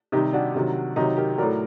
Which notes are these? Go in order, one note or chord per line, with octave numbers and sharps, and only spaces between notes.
C3 D#3 G3 D#4 G4
D4 F#4
C3 D#3 F#3
C3 D#3 F#3 D#4 G4
G4 A#4
A2 F#3 A#4 D5